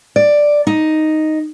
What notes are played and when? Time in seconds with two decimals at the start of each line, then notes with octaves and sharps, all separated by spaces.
0.16 D5
0.67 D#4